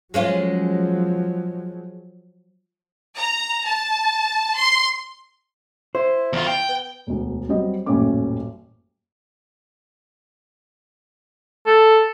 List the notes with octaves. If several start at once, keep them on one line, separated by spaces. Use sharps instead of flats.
F3 F#3 G#3 C#4 F4
A#5
A5
C6
E4 C5
E2 F4
G5
B3
E1 D2
F#3 G3 C4 D#5
D#1 A1 F#2 C#4 D6
A4